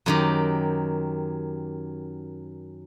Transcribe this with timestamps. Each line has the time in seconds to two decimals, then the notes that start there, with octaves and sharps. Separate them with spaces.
0.06 F#2 D#3 G4